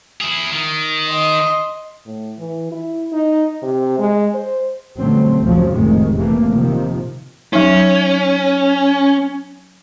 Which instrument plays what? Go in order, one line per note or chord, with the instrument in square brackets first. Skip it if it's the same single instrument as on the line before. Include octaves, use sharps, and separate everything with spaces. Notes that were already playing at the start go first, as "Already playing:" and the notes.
[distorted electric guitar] E4 G#4
D#3
[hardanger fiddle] D#5 C6
[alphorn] A2
E3
E4
D#4
C3
G#3
C5
[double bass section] B2 D3 F#3 G3 A3 C4
C2 F2 G#2 C#3 F3 F#3
F1 A2 D#3 G#3
C3 E3 A3 A#3
C3 D#3 F3
[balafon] F#3 D#4 [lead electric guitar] C#4